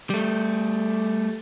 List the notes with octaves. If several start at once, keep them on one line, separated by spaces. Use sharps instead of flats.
G3 A3